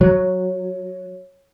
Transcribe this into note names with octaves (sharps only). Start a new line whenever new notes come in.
F#3 C#5